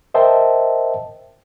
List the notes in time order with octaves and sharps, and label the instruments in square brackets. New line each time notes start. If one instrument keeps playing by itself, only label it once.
[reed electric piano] A#4 C5 D#5 E5 G5 A5